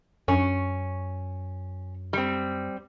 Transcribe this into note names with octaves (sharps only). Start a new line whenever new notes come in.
F#2 C#4
G3 C4